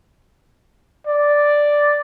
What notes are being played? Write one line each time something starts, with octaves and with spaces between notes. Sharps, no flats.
D5